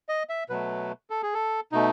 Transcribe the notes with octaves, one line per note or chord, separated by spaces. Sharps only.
D#5
E5
B2 F#3 A3 B4
A4
G#4
A4
B2 A3 D#4